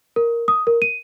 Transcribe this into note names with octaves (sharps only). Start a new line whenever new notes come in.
A#4
D#6
A#4
D#7